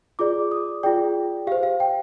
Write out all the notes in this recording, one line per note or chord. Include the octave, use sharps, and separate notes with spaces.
F4 G#4 D5 D6
D#6
F4 G#4 D5 G5
G4 C5 F5
F5
G5